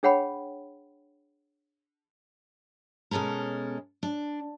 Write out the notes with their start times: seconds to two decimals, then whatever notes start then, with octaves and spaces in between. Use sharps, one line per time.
0.03 D4 G#4 C#5 F#5 G5 B5
3.11 B2 G#3 C#4 A4 A#4
4.03 D4